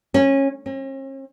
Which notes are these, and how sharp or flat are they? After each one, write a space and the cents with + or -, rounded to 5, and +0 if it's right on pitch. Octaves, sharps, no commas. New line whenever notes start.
C#4 -20
C#4 -45